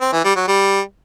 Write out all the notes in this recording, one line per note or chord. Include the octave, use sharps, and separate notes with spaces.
C4
E3
G3
F#3
G3